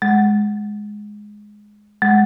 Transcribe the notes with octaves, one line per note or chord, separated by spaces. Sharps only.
G#3
G#3